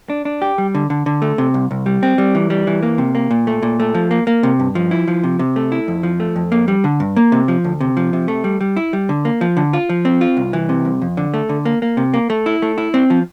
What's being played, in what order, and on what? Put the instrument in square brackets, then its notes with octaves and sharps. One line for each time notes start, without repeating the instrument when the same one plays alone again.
[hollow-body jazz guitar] D4
D4
G4
G3
D3
D3
D3
A3
C3
C2
C2
G3
C4
G3
E3
G3
E3
A#3
C3
A#3
A#2
A3
A#2
A3
F3
A#3
A#3
C3
G2
F3
E4
F3
C3
C3
A3
E4
F2
F3
A3
F2
A#3
G3
D3
G2
A#3
C3
F3
D2
C3
F3
C3
A3
G3
G3
E4
G3
D3
A#3
F3
D3
F4
F3
C4
F4
C2
E3
C3
C2
F2
D3
A3
D3
A#3
A#3
C3
A#3
A3
E4
A3
E4
C4
F3